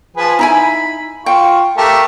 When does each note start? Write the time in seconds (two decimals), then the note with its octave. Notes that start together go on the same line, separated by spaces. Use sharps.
0.17 F3 G#4 B4
0.39 D#4 E4 G#5 B5
1.26 F4 G5 C#6
1.77 A3 G4 A#4